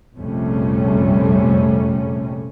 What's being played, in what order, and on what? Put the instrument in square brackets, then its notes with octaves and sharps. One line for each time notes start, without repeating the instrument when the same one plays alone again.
[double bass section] A#1 F2 C3 G3 A3 C#4